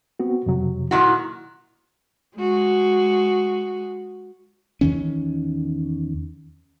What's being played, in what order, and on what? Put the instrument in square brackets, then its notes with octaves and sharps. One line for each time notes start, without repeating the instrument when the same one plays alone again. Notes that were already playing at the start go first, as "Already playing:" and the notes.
[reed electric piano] B3 C4 F#4
F2 C3 F#3
[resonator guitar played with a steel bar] A#2 D#3 F#4 [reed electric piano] E4
[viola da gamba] G#3 F#4
[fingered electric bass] E2 D#3 C#4